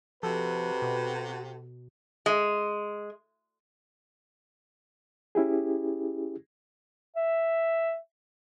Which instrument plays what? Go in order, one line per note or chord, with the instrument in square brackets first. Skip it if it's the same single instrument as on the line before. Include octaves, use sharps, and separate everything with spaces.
[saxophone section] C3 F#4 [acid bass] F3 [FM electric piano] A4 [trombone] B4
[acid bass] B2
[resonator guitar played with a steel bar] G#3
[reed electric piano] C#4 E4 G4 G#4
[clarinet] E5